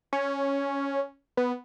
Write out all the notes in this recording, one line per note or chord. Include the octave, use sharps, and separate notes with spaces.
C#4
B3